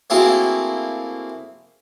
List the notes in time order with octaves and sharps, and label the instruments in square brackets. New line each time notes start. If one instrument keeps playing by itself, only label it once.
[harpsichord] A3 A#3 C4 E4 F#4 G#4